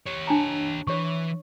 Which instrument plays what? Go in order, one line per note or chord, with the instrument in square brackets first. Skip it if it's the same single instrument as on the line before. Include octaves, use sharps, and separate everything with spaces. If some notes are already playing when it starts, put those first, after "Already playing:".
[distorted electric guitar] G4 C#5
[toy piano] D4 A5 A#5
[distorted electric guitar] E3 [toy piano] C#5 C#6